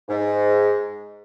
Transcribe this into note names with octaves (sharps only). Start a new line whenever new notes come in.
G#2